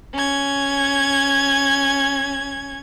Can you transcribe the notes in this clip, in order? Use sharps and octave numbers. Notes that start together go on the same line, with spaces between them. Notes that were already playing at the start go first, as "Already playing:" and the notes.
C#4 G#6